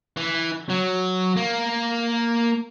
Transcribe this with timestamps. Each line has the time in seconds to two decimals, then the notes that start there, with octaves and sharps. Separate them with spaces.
0.17 E3
0.70 F#3
1.37 A#3